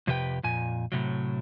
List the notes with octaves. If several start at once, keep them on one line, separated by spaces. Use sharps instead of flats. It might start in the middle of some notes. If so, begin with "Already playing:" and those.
F2 C3 G4 B4 G5
F2 A#2 G#5
A2 C3 F#3